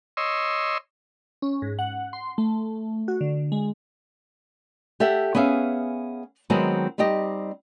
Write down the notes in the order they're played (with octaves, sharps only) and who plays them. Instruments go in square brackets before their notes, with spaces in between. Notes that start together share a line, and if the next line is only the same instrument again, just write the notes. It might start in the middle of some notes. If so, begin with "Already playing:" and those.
[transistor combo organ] C#5 D#5 C6 E6
[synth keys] C#4
G#2
F#5
C6
A3
F#4
D3
G#3
[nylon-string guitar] G4 A4 E5 F#5
B3 C#4 G#4 E5 F5
D#3 F#3 G#3 B3 C4 C5
G3 C4 D#4 G4 D#5